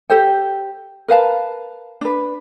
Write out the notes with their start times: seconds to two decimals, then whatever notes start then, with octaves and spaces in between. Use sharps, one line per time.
0.10 G4 A4 C5 G5
1.08 A#4 B4 F5 A5
2.01 D4 B4